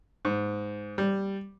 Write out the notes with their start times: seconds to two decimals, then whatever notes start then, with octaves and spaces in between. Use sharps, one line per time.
0.25 G#2
0.98 G3